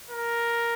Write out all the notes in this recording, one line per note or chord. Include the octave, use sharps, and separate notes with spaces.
A#4